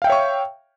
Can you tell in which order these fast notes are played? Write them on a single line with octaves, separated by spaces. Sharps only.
F5 G5 E5 C#5 C#6